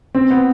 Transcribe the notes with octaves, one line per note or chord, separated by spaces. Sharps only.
C4
B3